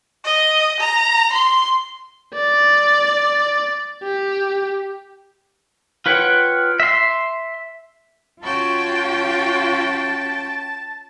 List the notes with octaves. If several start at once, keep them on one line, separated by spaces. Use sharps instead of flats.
D#5
A#5
C6
D5
G4
F4 B4 C#5 F#5 G5
E5 C6
C#4 F4 F#4 G5 A5